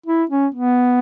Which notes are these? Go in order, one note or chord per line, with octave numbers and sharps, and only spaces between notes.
E4
C#4
B3